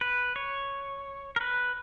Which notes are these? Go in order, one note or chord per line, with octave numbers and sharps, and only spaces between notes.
B4
C#5
A#4
B4